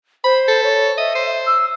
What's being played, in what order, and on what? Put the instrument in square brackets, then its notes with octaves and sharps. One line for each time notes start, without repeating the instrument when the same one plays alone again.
[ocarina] C5 [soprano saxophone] B5
[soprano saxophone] A4
[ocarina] C#5
[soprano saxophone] D#5 [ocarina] E5
[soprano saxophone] C5
[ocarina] E6